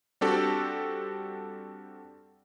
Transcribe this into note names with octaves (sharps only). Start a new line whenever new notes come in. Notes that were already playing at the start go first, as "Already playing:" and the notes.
G3 C4 D4 F#4 G4 A4